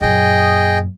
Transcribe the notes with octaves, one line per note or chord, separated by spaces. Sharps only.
F#2 A#2 G#4 D#5 G5